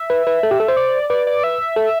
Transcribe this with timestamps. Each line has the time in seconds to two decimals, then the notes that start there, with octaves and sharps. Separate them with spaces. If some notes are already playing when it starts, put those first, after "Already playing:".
Already playing: E5
0.10 B4
0.27 B4
0.43 A4
0.51 G4
0.60 A4
0.68 C5
0.77 D5
1.10 B4 D5
1.27 D5
1.44 E5
1.76 A4